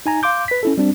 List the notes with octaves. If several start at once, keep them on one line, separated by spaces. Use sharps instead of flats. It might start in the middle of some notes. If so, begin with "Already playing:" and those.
D#4 G#5 A#5
F5 C6 D6 G6
B4 B6
C#4 E4 A4
G3 C4 D4